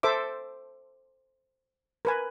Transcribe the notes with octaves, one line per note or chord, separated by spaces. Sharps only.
A4 C5 E5 D6
A#4 B4 G#5